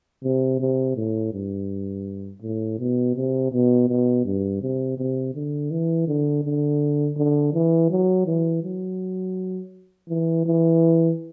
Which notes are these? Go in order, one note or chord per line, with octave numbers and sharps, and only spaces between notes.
C3
C3
A2
G2
A2
B2
C3
B2
B2
G2
C3
C3
D3
E3
D3
D3
D3
E3
F#3
E3
F#3
E3
E3